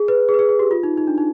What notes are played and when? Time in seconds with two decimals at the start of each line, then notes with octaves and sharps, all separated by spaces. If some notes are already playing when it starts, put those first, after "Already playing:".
Already playing: G#4
0.08 B4
0.29 G#4
0.34 B4
0.39 G#4
0.49 G#4
0.59 G4
0.71 F4
0.83 D#4
0.98 D#4
1.07 D4
1.18 D#4